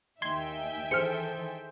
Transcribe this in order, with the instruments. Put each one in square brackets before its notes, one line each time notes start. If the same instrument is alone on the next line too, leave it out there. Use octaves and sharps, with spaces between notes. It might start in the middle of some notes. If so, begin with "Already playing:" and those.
[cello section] D#2 D#4 [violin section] E5 G5 G#5 [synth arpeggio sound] C6 G#6
[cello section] D#3 E3 A4 [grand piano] G#4 C5 [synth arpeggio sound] F6 C#7